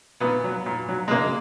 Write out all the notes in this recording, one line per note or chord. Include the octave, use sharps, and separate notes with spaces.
A#2 B3
F#3
A#2
F#3
G#3
C#3 A#3